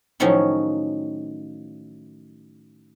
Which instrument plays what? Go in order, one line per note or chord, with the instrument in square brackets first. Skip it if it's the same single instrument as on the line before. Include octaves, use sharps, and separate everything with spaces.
[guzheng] A2 D#3 F3 F#3 C#4 D#4